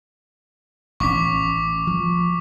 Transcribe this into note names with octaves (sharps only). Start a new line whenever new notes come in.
A1 C#4 C#6 D6 B6
F3